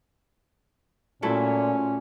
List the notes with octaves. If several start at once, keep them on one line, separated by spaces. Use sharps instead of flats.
A#2 F#3 A3 C#4 E4